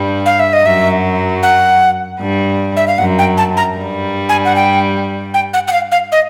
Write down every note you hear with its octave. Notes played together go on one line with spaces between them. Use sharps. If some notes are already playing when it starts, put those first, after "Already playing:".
Already playing: G2 G3
F5
E5
D#5
F#2 F#3 E5
F#5
G2 G3
E5
F5
F#2 F#3 F#5
G5
A5
A#5
G2 G3
G#5
F#5
G5
G5
F#5
F#5
F5
F5
D#5